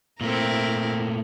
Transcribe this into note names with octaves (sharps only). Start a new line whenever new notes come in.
A#2 A3 C4 E4 A#4